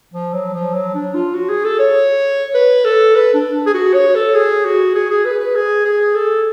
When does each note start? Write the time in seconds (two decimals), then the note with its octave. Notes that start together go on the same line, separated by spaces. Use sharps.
0.14 F3
0.33 F#3
0.54 F3
0.74 F#3
0.94 D4
1.14 F4
1.34 F#4
1.49 G#4
1.64 A4
1.79 C#5
2.54 B4
2.84 A4
3.15 B4
3.34 D4
3.66 G#4
3.74 F#4
3.94 C#5
4.15 A4
4.34 G#4
4.65 F#4
4.95 G#4
5.10 G#4
5.25 B4
5.39 B4
5.55 G#4
5.85 G#4
6.15 A4